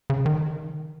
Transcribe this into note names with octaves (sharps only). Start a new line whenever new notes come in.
C#3
D#3